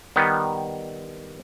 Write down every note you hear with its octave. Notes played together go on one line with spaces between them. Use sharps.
D#3 G3 B3